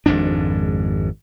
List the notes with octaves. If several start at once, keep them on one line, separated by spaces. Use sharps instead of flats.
G#1 F2 G#2 D4